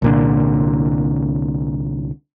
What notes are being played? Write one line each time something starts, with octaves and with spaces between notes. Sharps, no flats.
C2 A#2 D3